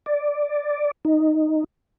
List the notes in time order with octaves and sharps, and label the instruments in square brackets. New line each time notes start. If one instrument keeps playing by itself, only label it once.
[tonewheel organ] D5
D#4